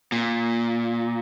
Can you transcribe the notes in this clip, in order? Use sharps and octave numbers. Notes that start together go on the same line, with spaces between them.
A#2